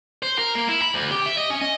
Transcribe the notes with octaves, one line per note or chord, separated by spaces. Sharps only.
C5
A#4
A#3
E4
B5
D2
G4
E5
D#5
C#4
D#5